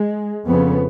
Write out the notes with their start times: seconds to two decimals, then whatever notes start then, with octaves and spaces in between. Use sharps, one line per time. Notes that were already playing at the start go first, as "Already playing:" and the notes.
Already playing: G#3
0.47 F2 C#3 B3